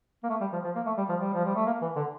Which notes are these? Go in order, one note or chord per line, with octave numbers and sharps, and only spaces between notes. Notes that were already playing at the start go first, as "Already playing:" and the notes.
A#3
A3
G3
F3
F3
A#3
A3
G3
F3
G3
F3
G3
A3
A#3
E3
D3